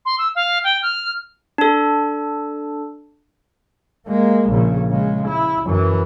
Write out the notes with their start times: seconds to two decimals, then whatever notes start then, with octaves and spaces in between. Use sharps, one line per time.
0.05 C6
0.18 E6
0.35 F5
0.64 G5
0.82 F6
1.58 D4 A4
4.07 G#3 A#3
4.50 A#1 C#3
4.90 C#3 G#3
5.28 E4
5.66 F#2 E3